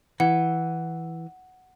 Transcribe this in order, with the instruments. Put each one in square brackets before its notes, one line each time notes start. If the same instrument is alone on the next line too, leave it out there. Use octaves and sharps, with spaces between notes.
[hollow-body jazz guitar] E3 [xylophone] F#5